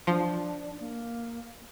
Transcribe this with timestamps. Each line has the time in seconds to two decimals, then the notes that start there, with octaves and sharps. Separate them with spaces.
0.07 F3 D4
0.80 A#3